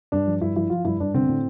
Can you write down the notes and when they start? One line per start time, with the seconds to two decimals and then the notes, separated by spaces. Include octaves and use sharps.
0.12 G2 D4
0.27 F3
0.41 G2 E4
0.56 F3 E4
0.70 F3 F4
0.85 G2 E4
1.00 G2 D4
1.14 D3 C4
1.29 A2